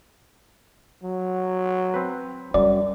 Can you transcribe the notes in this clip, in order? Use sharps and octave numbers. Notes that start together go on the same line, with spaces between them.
F#3
C4 B4
F#2 G3 D5